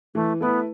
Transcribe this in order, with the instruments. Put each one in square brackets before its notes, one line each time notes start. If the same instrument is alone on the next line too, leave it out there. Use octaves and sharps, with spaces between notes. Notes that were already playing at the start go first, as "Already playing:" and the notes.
[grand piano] E3 [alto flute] A3
[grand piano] A3 E4 B4 [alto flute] B3